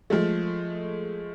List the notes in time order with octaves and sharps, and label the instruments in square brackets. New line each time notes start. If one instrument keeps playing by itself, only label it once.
[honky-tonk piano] F3 G#3 A3